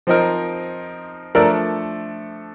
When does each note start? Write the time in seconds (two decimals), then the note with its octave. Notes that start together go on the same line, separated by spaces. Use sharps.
0.07 F3 C4 D#4 A#4
1.35 F3 A3 D4 A4 A#4 D5